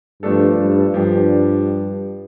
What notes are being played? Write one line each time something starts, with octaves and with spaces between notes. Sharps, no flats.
G2 F3 A3 D4 A4
G2
G2 F3 D4 G4